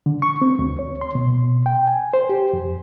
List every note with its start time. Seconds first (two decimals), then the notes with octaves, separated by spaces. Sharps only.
0.06 D3
0.22 C#6
0.42 C4
0.59 D2
0.79 C#5
1.01 C6
1.15 B2
1.66 G5
1.87 G#5
2.13 C5
2.29 G4
2.53 F2